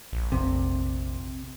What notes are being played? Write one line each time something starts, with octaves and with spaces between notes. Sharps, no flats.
A#1
F1 C3